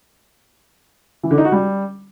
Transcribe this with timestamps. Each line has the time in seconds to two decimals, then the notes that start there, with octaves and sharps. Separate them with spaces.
1.23 E3
1.31 D3
1.38 D#4
1.45 F#4
1.52 G3